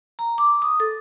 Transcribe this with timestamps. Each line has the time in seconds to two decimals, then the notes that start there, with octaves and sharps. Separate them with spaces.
0.19 A#5
0.38 D6
0.62 D#6
0.80 A4